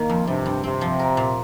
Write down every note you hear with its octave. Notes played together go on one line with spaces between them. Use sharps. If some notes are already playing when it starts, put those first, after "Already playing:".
Already playing: D#3 A#3
F2
G2 C3
G2
C3 C4
F3
A#4
A#2